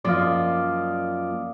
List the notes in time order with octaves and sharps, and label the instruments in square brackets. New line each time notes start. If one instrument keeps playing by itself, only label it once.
[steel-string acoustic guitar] F#2 F3 A#3 [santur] D5 D#5 F5